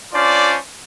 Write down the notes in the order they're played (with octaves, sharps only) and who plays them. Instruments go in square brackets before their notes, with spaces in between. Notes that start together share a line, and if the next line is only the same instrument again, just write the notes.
[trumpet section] C#4 D4 F4 C5 D5